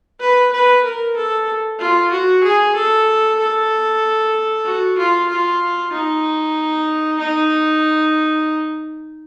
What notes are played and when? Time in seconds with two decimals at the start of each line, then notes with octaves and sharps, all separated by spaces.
0.20 B4
0.52 B4
0.83 A#4
1.16 A4
1.79 F4
2.11 F#4
2.43 G#4
2.75 A4
3.39 A4
4.65 F#4
4.98 F4
5.29 F4
5.93 D#4
7.20 D#4